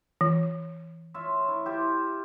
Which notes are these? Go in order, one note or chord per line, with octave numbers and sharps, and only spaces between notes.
E3
F4 C#5 E5
E4
F4 G4 E5